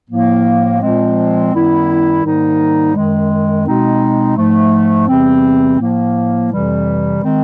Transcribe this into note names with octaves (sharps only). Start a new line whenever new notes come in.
A2 F3 A#3
A#2 F3 G#3 C4
F#2 D#3 G3 B3 E4
G#2 D#3 G3 A#3 D#4
F#2 D#3 G#3
B2 G#3 C4 D#4
G#2 F3 A3
E2 C3 E3 G3 C4
A2 F3 A#3
F2 C3 E3 G3
D#3 G#3 C4